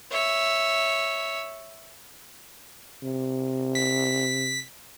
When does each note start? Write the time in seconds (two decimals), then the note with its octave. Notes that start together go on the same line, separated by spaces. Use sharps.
0.12 C#5 E5
3.03 C3
3.75 B6